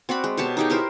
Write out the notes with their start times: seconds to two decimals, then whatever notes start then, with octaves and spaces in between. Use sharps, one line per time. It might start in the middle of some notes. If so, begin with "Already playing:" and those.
0.09 C4 F#4 D5 B5
0.24 G#3
0.37 B2 G4 C#5 A5
0.57 D#4 G4 G#4
0.70 E4 G4 A#4 C5